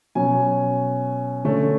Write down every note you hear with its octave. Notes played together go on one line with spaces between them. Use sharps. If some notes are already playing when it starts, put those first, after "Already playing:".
B2 F#3 C#4 G#5
D3 A3 C#4